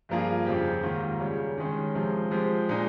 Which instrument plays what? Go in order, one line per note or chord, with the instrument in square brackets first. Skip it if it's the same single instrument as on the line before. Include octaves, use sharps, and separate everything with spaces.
[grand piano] G2 F3 A#3 F4 G#4
F2 C#3 F3 C4 G4
G#2 D#3 A#3 F4
C#3 G3 C#4
D#3 G#3 C#4
C3 F3 G#3 C4
F3 G#3 C4 G4
A#2 G#3 D#4